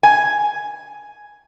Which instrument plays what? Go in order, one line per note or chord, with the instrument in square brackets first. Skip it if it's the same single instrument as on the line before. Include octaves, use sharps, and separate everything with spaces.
[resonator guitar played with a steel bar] G#5